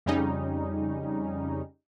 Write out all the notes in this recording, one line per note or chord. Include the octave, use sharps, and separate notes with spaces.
F2 C#3 G3 C#4 D#4